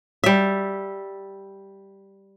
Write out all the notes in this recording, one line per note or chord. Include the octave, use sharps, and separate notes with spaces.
G3 E5